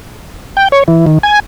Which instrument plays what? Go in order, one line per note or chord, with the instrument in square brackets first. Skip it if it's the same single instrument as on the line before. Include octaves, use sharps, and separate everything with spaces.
[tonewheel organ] G5
C#5
E3
D#3
G#5